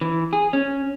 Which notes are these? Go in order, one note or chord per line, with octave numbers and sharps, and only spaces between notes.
E3
G#4
C#4